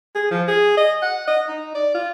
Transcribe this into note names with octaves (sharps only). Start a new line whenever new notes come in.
G#4
F3
G#4
D#5
F#5
D#5
D#4
D5
F4